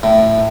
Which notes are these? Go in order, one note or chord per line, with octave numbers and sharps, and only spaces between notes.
A2